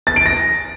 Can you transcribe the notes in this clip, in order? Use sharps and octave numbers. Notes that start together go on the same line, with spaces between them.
A6
D7
A#6